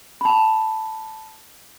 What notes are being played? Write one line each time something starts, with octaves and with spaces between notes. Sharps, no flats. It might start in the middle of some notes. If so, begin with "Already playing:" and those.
A5 B5